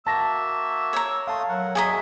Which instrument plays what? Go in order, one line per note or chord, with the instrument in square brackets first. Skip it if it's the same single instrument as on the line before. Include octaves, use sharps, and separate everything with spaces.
[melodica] A#3 F#4 E5 [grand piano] A5 A#6 [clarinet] E6
[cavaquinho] C#5 A#5
[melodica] A3 C6 D#6 [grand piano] F5 A5
[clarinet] F#3 [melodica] A#4 F#5
[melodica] F#4 E5 [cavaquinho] G#4 D#5 A#5 [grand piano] G#6 B6